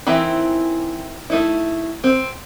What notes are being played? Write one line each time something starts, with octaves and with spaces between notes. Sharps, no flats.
D#3 E3 C4 E4
A3 D#4 E4
C4